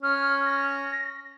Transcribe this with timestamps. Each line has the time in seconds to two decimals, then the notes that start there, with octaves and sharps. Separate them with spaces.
0.03 C#4 F6
0.46 A#6